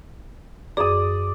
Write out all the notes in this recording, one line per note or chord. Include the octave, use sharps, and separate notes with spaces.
F#2 G#4 D5 D#6